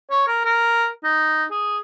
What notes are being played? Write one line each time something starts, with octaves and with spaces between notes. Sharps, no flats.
C#5
A#4
A#4
D#4
G#4